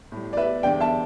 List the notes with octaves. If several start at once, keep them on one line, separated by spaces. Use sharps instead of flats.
A2 G3
D5
B4 E5
E2 D3 G3 D5 G5
E5 A5